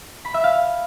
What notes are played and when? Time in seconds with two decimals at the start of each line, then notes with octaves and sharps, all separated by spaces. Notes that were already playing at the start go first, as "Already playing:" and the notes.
0.25 B5
0.34 E5
0.44 F5